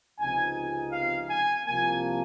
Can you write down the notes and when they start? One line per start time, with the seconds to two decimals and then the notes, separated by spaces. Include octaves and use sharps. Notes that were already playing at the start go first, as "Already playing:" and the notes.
0.19 C#2 C3 F3 C4 D#4 G#5
0.56 G#5
0.92 F5
1.29 G#5
1.66 C2 C3 F3 A#3 G#5